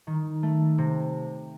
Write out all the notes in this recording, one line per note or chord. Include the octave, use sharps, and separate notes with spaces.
D#3
A3
C3